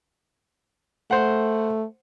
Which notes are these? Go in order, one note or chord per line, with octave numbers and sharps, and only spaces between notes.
A3 C5 F#5